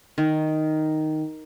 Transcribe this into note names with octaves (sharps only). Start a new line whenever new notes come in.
D#3